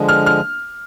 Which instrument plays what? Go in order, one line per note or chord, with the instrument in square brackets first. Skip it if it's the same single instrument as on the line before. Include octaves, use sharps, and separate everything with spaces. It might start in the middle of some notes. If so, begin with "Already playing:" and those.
Already playing: [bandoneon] D3 F3 G#3
[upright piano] F6
F6